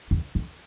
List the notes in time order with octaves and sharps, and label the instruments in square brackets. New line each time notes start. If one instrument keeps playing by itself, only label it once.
[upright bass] E2
F2